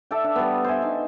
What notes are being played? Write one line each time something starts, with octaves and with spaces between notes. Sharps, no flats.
A4 D5 E5 G5
D4
G3 B3
C5 E5 G#5
D#4